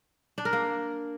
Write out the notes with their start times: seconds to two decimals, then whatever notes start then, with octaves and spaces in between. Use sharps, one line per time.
0.38 D4
0.45 A#4
0.53 A#3